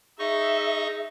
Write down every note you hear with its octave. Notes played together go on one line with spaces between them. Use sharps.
D#4 G#4 D#5 E5 C#6